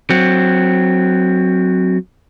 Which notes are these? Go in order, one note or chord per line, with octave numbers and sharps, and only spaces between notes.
F#3 C4